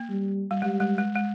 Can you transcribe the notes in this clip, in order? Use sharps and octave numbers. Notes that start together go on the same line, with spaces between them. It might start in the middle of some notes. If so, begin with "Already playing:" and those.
Already playing: A#3
G3
G3
G3 G#3
G#3
G#3
G#3